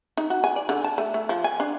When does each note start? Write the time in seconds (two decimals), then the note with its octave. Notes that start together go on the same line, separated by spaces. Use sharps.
0.17 D#4
0.30 F#4
0.44 G#5
0.56 D5
0.69 D3
0.84 A5
0.98 A3
1.14 A3
1.29 F3
1.44 G#5
1.60 D4